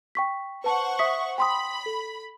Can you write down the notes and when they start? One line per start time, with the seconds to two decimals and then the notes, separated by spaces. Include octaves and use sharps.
0.15 G5 C#6 B6
0.64 B4 C5 F#5 A5 C#6
0.99 E5 D#6 B6
1.38 G5 B5 C6 D#6
1.86 A4